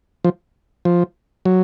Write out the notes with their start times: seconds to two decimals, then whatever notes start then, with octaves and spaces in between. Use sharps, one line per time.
0.24 F3
0.85 F3
1.45 F#3